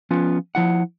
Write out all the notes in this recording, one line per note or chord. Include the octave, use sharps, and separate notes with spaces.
F3 B3 C#4 F4
F3 E4 F#5